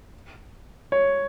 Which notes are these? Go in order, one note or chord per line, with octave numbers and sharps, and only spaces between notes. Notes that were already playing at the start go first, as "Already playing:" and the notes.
C#5